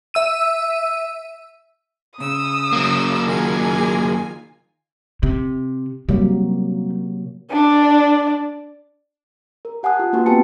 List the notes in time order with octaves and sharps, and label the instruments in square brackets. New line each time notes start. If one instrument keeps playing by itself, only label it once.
[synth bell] E5 E6 D#7
[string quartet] C#3 E6 [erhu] D#6
[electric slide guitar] F#3 A#3
[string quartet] D#3 F4 G#5 [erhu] G#4
[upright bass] C3
[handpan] C3 F#3 A#3 [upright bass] G3
[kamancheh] D4 D5
[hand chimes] A#4
G4 F#5 G#5 A5 D#6 F#6
F4 G4
A#3 D4 F#4 G4 B4
B3 C4 B4 G5 A5 C#7